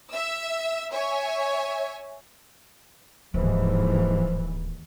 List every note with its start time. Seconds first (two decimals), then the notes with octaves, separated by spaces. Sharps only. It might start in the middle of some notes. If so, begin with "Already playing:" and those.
0.10 E5 E6
0.91 C#5 E5 G#5
3.34 D1 D#2 G#2 E3 F3